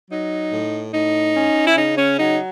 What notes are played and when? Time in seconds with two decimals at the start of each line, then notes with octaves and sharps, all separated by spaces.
0.11 F#3 D#4
0.53 A2
0.94 A2 D#4
1.36 C#4
1.67 E4
1.77 C#3 D#4
1.98 C#4
2.19 F#3 D#4